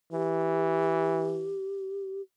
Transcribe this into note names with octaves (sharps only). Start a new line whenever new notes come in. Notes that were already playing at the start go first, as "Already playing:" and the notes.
E3 G4